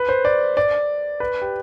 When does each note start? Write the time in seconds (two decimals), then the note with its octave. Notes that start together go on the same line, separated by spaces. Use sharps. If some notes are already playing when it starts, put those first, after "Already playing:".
Already playing: B4
0.09 C5
0.25 D5
0.57 D5
1.20 B4
1.42 G4